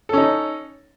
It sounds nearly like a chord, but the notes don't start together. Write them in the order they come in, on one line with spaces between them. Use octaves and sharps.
A4 C#4 D#4